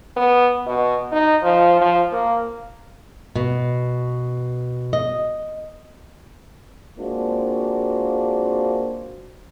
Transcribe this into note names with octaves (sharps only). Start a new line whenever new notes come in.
B3
B2
D#4
F3
F3
A#3
B2
D#5
G#3 A#3 C4 D4 F4 F#4